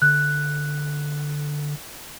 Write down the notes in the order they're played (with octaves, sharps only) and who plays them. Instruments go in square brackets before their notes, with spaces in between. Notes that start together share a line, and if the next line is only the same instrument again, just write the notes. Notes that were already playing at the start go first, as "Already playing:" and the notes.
[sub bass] D3 [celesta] F#6